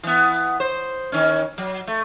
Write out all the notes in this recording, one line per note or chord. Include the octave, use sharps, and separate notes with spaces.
E3 B3
C5
D#3 C#4
F#3
A3